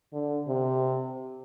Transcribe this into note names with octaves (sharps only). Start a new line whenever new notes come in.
D3
C3